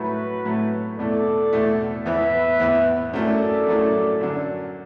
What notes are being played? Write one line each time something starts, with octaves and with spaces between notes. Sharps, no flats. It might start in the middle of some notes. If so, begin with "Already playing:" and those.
Already playing: A2 F#3 A3 E4 F#4 B4
A2 F#3 A3 E4
E2 B2 A3 E4 A4 D5
E2 B2 A3 E4
E2 E3 B3 B4 E5
E2 E3 B3
F#2 F#3 A3 E4 A4 D5
F#2 F#3 A3 E4
F#2 D3 F#3 D4